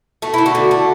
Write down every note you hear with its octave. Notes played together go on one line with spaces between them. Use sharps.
A3 F#4
D3 E4
F#4
D3
A3